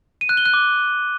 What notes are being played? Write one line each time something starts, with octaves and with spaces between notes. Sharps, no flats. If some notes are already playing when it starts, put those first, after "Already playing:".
D#7
F#6
G7
F#6
D6